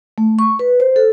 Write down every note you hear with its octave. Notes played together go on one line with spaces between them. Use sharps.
A3
C#6
B4
C5
A4